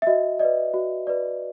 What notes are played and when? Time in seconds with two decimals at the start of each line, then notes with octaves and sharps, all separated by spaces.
0.02 E5
0.07 F#4 D#5
0.39 B4 D5 D#5
0.74 F#4
1.07 B4 D5